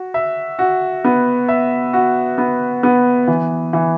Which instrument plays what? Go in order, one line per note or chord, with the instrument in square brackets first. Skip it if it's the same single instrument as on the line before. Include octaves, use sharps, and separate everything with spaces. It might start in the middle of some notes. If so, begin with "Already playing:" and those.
Already playing: [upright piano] F#4
E5
F#4
B3
E5
F#4
B3
B3
E3
E3